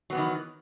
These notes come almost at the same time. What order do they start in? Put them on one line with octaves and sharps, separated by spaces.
F#3 B3 E3 D#3